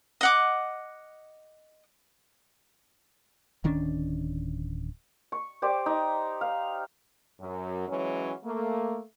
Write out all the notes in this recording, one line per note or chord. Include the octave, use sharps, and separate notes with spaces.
D#5 F#5 D6
D1 D#3 C#4 D4
C#6
G4 C5 D5
D#4
F5
F#2
E3 F#3 G#3 C#4
A3 A#3